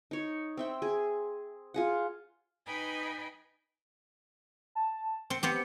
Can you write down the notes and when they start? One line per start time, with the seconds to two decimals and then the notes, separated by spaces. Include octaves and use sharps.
0.11 D#4 C#5
0.57 C4 E5 G5
0.82 G#4
1.74 F4 G#4 F#5
2.67 D#4 B4 D#5 G5 G#5 B5
4.75 A5
5.30 C4 C#7
5.43 B3 C4 G4